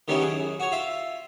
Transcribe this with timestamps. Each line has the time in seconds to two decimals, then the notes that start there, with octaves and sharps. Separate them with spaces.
0.08 D#3 G3 B3 C#4 D#4 E4
0.22 F#2 G#4
0.60 F#4 C#5
0.72 F4 E5